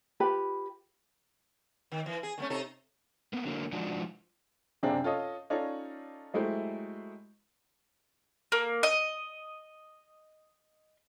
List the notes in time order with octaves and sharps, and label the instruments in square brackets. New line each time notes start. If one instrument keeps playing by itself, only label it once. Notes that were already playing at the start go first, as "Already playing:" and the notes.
[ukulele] F4 G4 B4 B5
[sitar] D#3
E3
G#4
D#3 A3 C#4
C3 D#4 A4
[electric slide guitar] A#3 B3
D3 F#3 A#3
F3 G#3 D4 D#4 F4 F#4
[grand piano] F#1 C3 C4 D4 G#4 A#5
F4 A4 C#5 D#5
C#4 D#4 F4 A4 C#5 D5
F#3 G#3 A3 E4 G4 C5
[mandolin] A#3
D#5